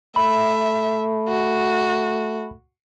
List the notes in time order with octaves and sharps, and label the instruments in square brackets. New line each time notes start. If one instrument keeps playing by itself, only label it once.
[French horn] A3 [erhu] E5 [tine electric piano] B5
[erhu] F#4